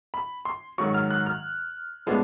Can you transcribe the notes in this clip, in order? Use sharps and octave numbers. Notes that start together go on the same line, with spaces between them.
B5
C6
G#2 D#3 F#3 C#6
F6
F#6
F6
A2 F3 G#3 B3 D4